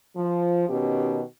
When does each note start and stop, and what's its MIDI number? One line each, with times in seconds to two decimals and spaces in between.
0.16 0.64 53
0.69 1.20 47
0.69 1.20 51
0.69 1.20 61
0.69 1.20 67